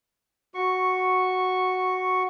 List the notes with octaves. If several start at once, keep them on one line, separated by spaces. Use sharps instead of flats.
F#4 C#6